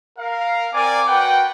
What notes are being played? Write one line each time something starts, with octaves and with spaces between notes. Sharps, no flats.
A#4 F5
C4 A#4 D5 G#5 D6
F#4 B4 F#5 G5